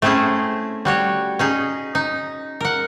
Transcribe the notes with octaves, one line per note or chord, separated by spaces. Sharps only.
A3 C4 C#4 E4 G#4
G3 F#4 C#5
C#4 D#4 G#4
D#4
A#4 F#5